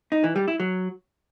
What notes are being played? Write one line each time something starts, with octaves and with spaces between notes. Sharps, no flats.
D#4
E3
G3
E4
F#3